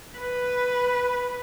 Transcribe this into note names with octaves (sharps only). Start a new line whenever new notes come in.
B4